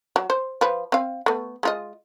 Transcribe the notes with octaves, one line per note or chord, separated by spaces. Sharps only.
F#3
C5
F3 B4
C4 F5
A3 B3
G#3 F4 D#5